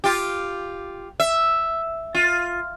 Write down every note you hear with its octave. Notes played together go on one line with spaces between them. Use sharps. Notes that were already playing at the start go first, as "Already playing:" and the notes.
F4 G4
E5
F4